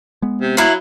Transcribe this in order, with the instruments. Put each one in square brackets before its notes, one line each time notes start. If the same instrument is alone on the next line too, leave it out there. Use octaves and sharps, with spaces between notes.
[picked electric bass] G#3 B3
[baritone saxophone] C3
[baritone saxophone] F#3 [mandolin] E4 F5